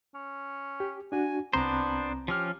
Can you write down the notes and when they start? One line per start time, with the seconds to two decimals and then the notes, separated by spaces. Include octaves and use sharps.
0.14 C#4
0.80 G4
1.12 D4 F#4 G#5
1.53 C2 B3 C4 D4 C5 A#5
2.28 F3 C#4 G4 F6